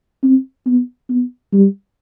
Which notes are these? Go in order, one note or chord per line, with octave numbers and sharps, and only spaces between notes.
C4
B3
B3
G3